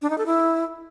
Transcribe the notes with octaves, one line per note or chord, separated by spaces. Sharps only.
D4
D#4
A4
E4